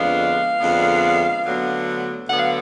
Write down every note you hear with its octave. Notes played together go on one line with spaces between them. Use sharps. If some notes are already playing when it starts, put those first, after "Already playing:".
Already playing: F2 D3 G#3 B3 D4 F5
F2 D3 G#3 B3 D4
D2 D3 F#3 B3
D2 D3 F#3 B3 F#5
F5